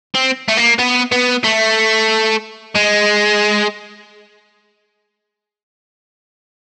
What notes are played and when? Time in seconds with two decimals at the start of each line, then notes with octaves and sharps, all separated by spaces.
0.15 C4
0.48 A3
0.57 A#3
0.79 B3
1.12 B3
1.44 A3
2.76 G#3